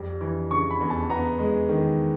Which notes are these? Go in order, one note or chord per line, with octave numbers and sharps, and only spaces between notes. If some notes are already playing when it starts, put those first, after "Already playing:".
Already playing: F2 G3
E3
C#3 C#6
B5
E2
A5
B3 A#5
G#3
D#3